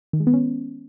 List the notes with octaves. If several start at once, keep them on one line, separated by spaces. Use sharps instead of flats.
D#3
G#3
B3
C#4